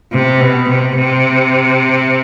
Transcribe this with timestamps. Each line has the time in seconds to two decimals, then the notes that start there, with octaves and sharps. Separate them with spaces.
0.12 C3
0.40 B2
0.69 C3
0.97 C3